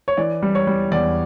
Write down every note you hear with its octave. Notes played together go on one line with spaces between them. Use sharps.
C#5
E3 D5
G3
C#5
G3
E2 D5